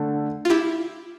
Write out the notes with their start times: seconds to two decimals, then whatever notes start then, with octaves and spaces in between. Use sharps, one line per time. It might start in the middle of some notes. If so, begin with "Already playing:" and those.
Already playing: D3 A3
0.45 F4
0.50 E4 G4